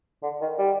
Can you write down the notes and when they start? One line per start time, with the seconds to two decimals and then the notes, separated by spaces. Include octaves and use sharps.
0.23 D3
0.41 D#3
0.58 G3